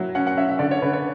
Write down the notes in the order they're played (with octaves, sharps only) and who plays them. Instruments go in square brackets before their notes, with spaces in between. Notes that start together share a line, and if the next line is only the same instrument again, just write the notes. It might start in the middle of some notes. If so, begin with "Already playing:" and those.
Already playing: [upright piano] F#3 E4
C#4 F#5
F#5
C#4 E5
E5
D3 D5
C#5
D3 B4
C#5